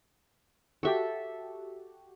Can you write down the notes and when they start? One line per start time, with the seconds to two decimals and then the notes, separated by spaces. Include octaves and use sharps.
0.83 F#4 G4 A4 E5